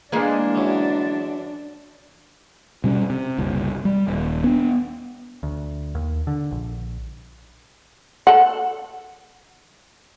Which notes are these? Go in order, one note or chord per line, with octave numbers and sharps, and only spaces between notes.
E3 G#3 A#3 D4
F#2 D3
B2 G3 C#4
C3
F#1 C2
G3
D#1
B3 D4
D2
D#2
D3
A#1
A4 F#5